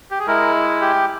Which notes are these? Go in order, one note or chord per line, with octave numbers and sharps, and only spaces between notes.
G4
G#4
G#3 E4 A#4
G4